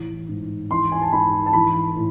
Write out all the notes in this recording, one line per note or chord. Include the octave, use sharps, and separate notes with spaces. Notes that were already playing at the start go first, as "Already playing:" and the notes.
Already playing: A2 E3
G#2
E3 C6
G#5
A5
G#2 B5
A5
E3 B5
A2